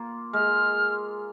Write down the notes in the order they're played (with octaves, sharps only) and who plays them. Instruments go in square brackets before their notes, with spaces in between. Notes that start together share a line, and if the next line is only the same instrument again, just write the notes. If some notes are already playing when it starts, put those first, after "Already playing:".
Already playing: [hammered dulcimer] A#3 F4
[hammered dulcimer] G#3 [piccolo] F6